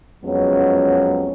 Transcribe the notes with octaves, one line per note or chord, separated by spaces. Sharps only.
F2 F#3 G#3 B3 C#4